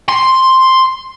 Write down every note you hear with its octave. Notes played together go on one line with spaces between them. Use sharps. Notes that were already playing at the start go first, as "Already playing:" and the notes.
C6